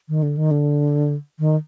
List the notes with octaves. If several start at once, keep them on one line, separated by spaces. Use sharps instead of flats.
D#3
D3
D#3
D3
D#3